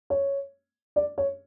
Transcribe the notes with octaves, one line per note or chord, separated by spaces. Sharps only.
C#5
D5
C#5